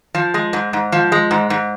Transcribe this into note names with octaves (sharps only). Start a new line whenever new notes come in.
F3
G#3
G#2
G#2
F3
G#3
G#2
G#2